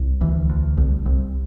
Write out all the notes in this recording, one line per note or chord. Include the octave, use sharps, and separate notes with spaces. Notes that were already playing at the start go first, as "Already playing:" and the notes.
Already playing: C2
D2 E3
D2
C2
C2